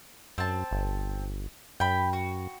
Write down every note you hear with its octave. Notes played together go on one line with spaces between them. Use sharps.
F#2 C4 A5
G1
F#2 G5 B5
F#4